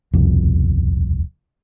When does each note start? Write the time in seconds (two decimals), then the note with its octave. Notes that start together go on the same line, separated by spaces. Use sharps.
0.13 D#1 C2 F2 B2